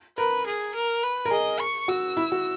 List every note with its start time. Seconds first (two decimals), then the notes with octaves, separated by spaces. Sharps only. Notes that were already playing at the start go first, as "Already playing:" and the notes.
0.17 A#4 B4
0.46 G#4
0.75 A#4
1.03 B4
1.25 A#4
1.31 G#4 D#5
1.60 C#6
1.88 F#4 E6
2.17 E4
2.32 F#4